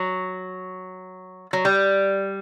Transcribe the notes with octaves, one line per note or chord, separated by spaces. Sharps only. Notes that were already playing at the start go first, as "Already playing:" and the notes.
Already playing: F#3
F#3
G3